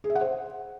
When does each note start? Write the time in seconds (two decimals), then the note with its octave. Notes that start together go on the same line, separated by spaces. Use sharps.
0.04 G#4
0.10 E5
0.15 F#5
0.21 C5